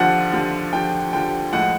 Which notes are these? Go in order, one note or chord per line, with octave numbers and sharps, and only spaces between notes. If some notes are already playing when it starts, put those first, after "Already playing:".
Already playing: D#2 D3 F3 F#5
D#2 D3 F3
D#2 D3 F3 G5
D#2 D3 F3 G5
A2 F3 G#3 F#5